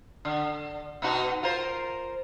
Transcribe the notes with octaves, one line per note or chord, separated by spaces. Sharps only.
D3
B2 D#4 F#4
F4 A#4 C5